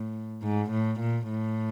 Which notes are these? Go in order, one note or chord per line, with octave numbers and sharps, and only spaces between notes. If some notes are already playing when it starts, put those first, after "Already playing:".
Already playing: A2
G#2
A2
A#2
A2